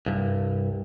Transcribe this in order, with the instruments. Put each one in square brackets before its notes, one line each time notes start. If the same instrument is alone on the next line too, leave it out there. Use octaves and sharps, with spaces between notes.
[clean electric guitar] C2 G2